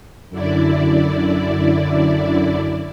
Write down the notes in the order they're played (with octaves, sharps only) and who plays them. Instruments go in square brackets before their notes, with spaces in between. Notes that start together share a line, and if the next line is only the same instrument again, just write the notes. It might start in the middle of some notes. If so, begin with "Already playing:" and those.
[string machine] F#2 D3 E4 D5